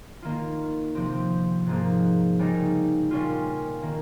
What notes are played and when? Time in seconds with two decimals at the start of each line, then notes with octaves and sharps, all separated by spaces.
0.22 D#3 A#3 F4
0.95 C3 F3 C4
1.66 G#2 F3 A#3
2.39 C#3 G3 A#3 D#4
3.11 A#2 G3 C#4 F4
3.82 D#3 A#3